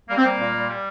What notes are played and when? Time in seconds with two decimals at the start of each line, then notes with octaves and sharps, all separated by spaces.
0.09 G3 A#3
0.17 C4
0.25 G3 A#3
0.40 A#2
0.55 G3
0.69 G3